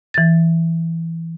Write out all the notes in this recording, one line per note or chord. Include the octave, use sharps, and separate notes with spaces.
E3 A6